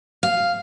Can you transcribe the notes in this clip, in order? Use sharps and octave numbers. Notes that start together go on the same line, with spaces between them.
F5